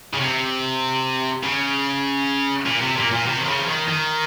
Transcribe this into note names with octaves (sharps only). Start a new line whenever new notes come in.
C#3
C3
C#3
A#2
C3
A#2
A#2
C3
D#3
C#3
F3
D#3
D#3